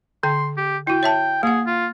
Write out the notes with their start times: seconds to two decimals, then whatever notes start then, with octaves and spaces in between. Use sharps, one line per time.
0.23 D3 G5 C6
0.57 G4
0.87 E4 F#4 G5
1.03 C#5 E5 A5
1.43 A#3 G#4 F#5
1.66 F4